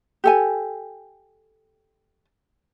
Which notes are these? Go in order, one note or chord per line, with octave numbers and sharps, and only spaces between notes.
G4 A4 G#5